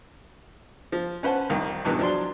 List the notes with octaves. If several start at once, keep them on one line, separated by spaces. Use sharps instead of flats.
F3
C#4 B4 C5 F#5 A5
C2 F2 D#3
E2 G2 B2 D#3 E3
F3 F#3 D4 C6